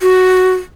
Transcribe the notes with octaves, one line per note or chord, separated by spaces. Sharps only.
F#4